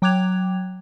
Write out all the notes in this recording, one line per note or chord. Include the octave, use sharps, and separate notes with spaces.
F#3 G5 D6 F#6 G#6 F7